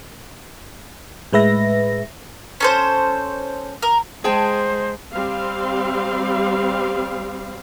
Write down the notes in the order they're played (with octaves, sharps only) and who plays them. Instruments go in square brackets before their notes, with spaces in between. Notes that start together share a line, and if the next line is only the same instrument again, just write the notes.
[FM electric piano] A2 G#3 B4 E5 A#6
[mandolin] C#4 A4 C5
A#4
[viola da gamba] G#3 [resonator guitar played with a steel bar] G#4 G5 A5 [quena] C5
[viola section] G3 C4 F5